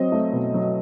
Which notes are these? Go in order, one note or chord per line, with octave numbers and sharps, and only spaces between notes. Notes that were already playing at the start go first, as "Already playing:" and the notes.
Already playing: F#3 C4 D#5
A3
B2
F#3